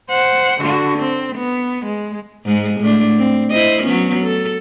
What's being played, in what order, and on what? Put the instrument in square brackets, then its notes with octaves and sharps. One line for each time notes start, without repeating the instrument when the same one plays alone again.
[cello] C5 F#5
D3 F#4
C4
B3
G#3
[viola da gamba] G#2 G#3
A2 A3 D4
C4
E4 C5 D#5
F#3 B3 C#4
A4